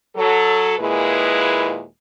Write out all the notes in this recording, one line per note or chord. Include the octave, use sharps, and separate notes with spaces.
F#3 A4
D#2 A#2 G#3 E4 G#4 B4